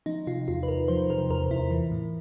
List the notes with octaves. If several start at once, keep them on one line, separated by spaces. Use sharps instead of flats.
F3 D#4
C3 F4
E2 F4
B4
E2 A#4
F3 C5
C3 A#4
E2 A#4
E2 E4
E3
A2